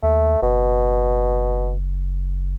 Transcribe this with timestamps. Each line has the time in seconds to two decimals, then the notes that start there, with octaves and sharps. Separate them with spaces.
0.03 D#2 A3
0.42 F#1 B2